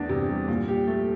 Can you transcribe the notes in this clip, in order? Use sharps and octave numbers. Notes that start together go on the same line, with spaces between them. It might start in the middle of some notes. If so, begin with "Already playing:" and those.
Already playing: E2 A3 D4
C3
G3
A#2
G4
A3